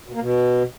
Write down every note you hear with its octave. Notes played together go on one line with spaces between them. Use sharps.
B2
A#3
B2